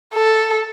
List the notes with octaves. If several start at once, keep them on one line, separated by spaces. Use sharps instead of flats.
A4